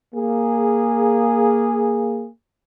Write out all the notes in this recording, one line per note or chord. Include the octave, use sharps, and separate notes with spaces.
A#3 G#4